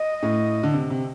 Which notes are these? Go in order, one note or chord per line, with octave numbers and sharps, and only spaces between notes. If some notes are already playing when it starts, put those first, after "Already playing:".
Already playing: D#5
A2
D3
C3
C3